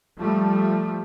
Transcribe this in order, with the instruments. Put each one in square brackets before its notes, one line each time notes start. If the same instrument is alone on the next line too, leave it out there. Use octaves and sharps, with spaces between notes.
[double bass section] F3 G3 A3